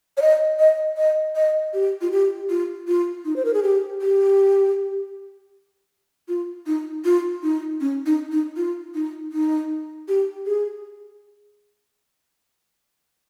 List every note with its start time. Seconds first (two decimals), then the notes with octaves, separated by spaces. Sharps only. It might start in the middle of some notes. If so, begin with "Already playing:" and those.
0.17 C#5
0.22 D#5
0.59 D#5
0.97 D#5
1.35 D#5
1.74 G4
2.01 F4
2.11 G4
2.50 F4
2.88 F4
3.25 D#4
3.36 C5
3.45 A#4
3.54 G#4
3.63 G4
4.01 G4
6.28 F4
6.67 D#4
7.05 F4
7.43 D#4
7.81 C#4
8.06 D#4
8.31 D#4
8.56 F4
8.94 D#4
9.32 D#4
10.08 G4
10.46 G#4